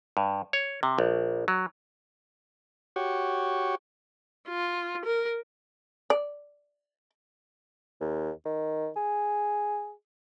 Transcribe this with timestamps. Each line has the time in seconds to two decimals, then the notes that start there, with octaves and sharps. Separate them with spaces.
0.17 G2
0.53 C#5
0.83 C3
0.98 A#1
1.48 F#3
2.96 F#4 G4 C#5
4.49 F4
5.05 A#4
6.10 D5
8.01 D#2
8.45 D#3
8.96 G#4